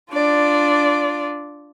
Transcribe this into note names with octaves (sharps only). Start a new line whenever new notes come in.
D4 F4 D5